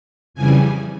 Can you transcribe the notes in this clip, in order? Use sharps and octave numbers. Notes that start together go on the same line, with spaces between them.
F2 C#3 E3 G3 G#5